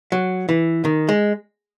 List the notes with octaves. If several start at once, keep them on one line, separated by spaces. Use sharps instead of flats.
F#3
E3
D#3
G#3